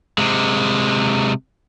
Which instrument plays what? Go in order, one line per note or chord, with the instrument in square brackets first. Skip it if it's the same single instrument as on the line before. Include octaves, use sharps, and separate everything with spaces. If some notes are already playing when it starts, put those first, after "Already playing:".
[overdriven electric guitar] C3 G#3